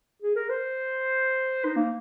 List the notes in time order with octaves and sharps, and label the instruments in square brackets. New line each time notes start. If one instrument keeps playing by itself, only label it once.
[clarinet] G#4
A#4
C5
D#4
A#3